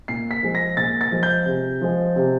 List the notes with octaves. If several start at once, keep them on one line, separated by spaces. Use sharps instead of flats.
A#2 C7
B6
F3 G#3
A#6
A#2 A6
A6
F3 G#3
G6
C3
F3 G#3
C3